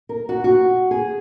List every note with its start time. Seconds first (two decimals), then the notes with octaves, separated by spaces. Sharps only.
0.09 A#4
0.29 F#4
0.44 F#4
0.91 G#4